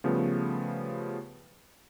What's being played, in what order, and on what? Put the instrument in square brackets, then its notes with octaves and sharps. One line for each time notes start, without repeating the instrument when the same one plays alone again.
[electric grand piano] C#3 F3 G3 A3 B3